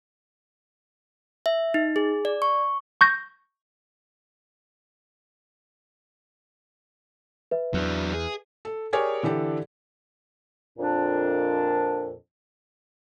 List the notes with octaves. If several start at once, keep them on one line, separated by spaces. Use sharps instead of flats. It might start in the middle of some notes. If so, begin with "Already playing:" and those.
E5
D#4
G#4
D5
C#6
C#6 G6 A#6
B4 E5
E2 F#3 D4
G#4
A4
G4 G#4 A#4 C#5 D5 G#5
D3 E3 G4 A4 D5
F2 A#2 D4